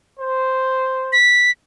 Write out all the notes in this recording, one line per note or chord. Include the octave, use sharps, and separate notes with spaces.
C5
B6